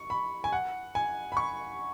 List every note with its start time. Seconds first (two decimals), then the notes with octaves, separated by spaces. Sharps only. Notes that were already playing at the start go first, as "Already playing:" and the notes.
Already playing: C#6
0.10 B5
0.44 G#5
0.52 F#5
0.95 G#5
1.32 B5
1.37 C#6